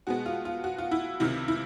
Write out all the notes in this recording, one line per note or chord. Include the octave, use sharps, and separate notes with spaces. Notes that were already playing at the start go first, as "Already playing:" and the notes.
B2 G#3 B3 F#4
F4
F4
F#4
F4
E4
C#2 C3 D#3 E4
E4